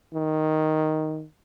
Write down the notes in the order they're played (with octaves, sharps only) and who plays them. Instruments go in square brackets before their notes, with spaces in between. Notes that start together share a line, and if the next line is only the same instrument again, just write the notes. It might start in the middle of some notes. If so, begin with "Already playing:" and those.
[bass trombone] D#3